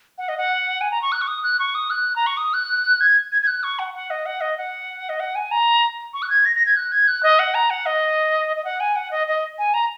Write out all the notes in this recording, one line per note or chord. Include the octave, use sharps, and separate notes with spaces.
F#5
D#5
F#5
G#5
A#5
C#6
F#6
C#6
D#6
F#6
C#6
D#6
F#6
A#5
C#6
D#6
F#6
G#6
G#6
G#6
F#6
C#6
F#5
F#5
D#5
F#5
D#5
F#5
D#5
F#5
G#5
A#5
C#6
F#6
G#6
A#6
A#6
G#6
F#6
G#6
F#6
D#5
F#5
A#5
F#5
D#5
D#5
F#5
G#5
F#5
D#5
D#5
G#5
A#5